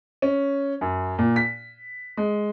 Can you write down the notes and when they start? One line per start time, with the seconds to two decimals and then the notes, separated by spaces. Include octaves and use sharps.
0.22 C#4
0.81 F#2
1.19 A#2
1.36 B6
2.17 G#3